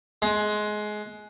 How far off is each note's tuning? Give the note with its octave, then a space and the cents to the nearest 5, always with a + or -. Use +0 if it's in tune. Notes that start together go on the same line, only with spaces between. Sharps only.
G#3 +20